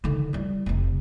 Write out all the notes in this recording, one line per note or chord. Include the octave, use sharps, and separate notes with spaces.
D3 D#3
G3 E4
F1 C3